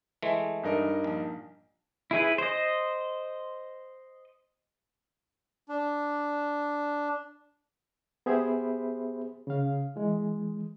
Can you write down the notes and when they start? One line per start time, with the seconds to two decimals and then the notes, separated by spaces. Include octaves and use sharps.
0.22 E3 G#3 A3
0.63 G2 D#4 A#4
1.04 A#1
2.11 E4 G#4 B4
2.38 C5 D#5
5.69 D4
8.26 B3 G4 G#4 C5 E5 B5
9.47 C#3 F5
9.96 E3 G#3